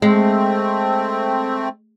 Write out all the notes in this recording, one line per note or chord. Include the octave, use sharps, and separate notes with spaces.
G#3 A3 C4